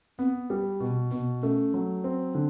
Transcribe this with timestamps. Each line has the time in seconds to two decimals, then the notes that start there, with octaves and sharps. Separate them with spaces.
0.19 B3 C4
0.50 G3
0.80 B2 B3
1.11 B2 B3
1.42 A3 C#4
1.74 F#3
2.04 C4
2.35 D3